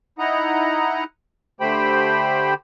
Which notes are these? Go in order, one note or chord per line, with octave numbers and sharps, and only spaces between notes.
D#4 E4 D#5 F#5 A#5
D3 A3 G4 C5 G5 B5